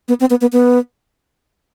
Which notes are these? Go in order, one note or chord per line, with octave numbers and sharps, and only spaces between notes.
B3
C4
B3
B3
B3